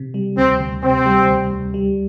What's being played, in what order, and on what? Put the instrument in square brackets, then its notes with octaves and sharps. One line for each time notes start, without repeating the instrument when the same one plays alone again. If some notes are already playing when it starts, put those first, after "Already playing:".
Already playing: [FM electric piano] C3
G3
[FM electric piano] D2 [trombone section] C4
[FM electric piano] D2
[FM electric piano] C3 [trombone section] C4
[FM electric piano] G3
D2
D2
G3